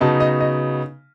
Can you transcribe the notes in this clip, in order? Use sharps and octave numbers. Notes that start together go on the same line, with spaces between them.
C#3 F#3 B3 D#4 A5
D#5
D#5